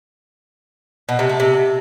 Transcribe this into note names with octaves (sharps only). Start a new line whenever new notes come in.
B2
C3
A3
C3